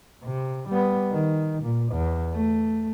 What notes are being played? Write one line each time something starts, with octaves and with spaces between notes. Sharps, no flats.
C3
G3 B3
D#3
A#2
E2
A3